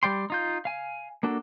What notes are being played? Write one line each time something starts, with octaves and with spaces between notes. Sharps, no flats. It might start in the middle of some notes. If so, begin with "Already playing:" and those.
G3 D5 G5 C6
D#4 F4 G6
F5 G#5
A#3 D4 F#4 A4